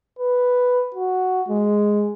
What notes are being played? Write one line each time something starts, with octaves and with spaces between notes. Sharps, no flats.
B4
F#4
G#3